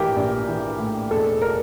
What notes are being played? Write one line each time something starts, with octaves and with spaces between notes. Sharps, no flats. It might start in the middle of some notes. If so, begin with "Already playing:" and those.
Already playing: A#1 A2 E3 G4 A#4
A#1
E3
A2
E1 A4
A#4